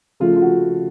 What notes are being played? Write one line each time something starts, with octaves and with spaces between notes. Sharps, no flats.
C#3 F3 A3 F4
F4
F#4